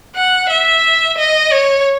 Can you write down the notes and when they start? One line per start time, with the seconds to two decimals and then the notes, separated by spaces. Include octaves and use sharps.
0.16 F#5
0.50 E5
1.18 D#5
1.52 C#5